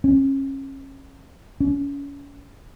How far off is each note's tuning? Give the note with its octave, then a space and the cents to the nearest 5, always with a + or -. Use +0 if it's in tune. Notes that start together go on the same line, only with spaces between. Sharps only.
C#4 -30
C#4 +30